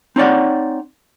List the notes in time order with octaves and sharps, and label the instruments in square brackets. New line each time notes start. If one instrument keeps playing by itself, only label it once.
[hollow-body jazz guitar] C4 D#4 C#5 D5 F#5